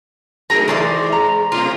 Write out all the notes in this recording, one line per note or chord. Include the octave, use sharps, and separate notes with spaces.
F#3 A3 D#4 G#4 A#4 A#5
E3 F3 G#3 G4 C5 D5 C6
A#5
B2 A3 C4 F4